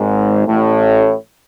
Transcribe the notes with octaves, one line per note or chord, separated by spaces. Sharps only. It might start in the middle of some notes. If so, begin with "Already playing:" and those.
Already playing: G#1 G#2
A1 A2